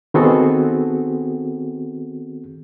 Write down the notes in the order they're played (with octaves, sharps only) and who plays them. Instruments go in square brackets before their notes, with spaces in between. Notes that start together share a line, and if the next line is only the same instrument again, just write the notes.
[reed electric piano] D#3 B3 C4 F#4 G#4 A4